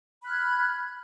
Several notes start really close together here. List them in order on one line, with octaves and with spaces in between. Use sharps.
B5 F#6 F6 G#6